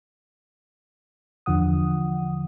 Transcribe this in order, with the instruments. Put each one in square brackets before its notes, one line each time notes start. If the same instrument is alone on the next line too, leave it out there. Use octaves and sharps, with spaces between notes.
[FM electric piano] E2 D3 F3 F#5 D#6